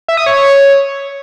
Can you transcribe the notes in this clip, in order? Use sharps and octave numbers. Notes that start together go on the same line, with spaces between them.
E5
D#6
C#5